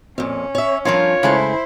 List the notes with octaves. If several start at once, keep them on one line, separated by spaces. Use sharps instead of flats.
F2 A#2 C#4
C#5 E5
G2 F3 F4 A#4 C#5
C#3 G#3 A3 E4 C5